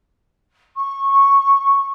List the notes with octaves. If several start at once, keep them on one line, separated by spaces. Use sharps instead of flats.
C#6